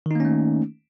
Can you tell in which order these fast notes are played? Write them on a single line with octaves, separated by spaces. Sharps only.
D#3 D#4 A#3 C#4 A3